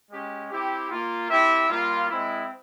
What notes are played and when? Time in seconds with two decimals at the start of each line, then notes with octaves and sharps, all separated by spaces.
0.11 G#3 C#4 G4
0.51 C4 E4 G4
0.90 A#3 F4
1.30 C4 E4 G4 E5
1.69 G3 A#3 F4
2.10 G#3 C4 E4